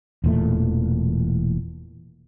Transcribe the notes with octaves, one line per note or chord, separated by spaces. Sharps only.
E1 E2 A#2 A3